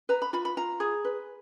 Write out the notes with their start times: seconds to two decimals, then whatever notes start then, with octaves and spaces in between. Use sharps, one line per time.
0.09 B4 A#5
0.22 B5
0.33 F4 B5
0.45 B5
0.57 F4 A#5
0.80 G#4
1.05 B4